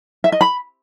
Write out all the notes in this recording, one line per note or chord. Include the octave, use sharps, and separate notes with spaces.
E5
D#5
B5